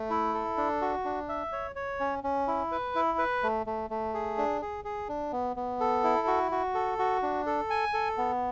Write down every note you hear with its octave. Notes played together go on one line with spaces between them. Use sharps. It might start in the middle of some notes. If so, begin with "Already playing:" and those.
Already playing: A3
E4
A4
D4
F#4
D4
E5
C#5
C#5
C#4
C#4
E4
B4
E4
B4
A3
A3
A3
G#4
D4
G#4
G#4
D4
B3
B3
A4
E4
F#4
F#4
A4
F#4
D4
A4
G#5
A4
B3